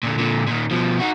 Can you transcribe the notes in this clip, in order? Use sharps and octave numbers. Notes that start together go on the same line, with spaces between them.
A#2 D3
A#2 D3
A#2 D#3
B2 F3
D#4 F#4